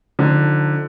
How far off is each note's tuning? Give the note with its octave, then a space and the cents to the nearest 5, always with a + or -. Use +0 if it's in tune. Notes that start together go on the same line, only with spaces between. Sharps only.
D3 +0 F3 +30 D#4 +0